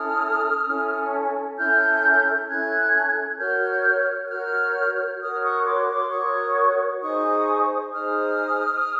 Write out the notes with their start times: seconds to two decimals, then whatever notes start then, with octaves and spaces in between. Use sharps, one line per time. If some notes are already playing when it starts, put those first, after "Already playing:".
Already playing: C#4 E4 A4 D#6 F6
0.65 C#4 E4 A4
1.57 C#4 E4 A4 F6 G6
2.47 C#4 E4 A4 F#6 G#6
3.38 F#4 A#4 C#5 F6 G6
4.24 F#6
4.28 F#4 A#4 C#5 F6 G6
5.20 F#4 A#4 C#5 D#6 F6
5.42 C#6 D#6
5.65 C6 D6
5.87 C6 D6
6.10 F#4 A#4 C#5 C#6 D#6
7.01 D#4 G#4 C5 C#6 D#6
7.92 D#4 G#4 C5 D#6 F6